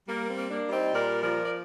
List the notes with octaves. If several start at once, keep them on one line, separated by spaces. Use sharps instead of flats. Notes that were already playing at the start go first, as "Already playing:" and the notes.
G3 A#3
C4
A#3
A#3 D4
G3
C4 D#4
A#2 A#4 D5
F3 A#4 D5
D5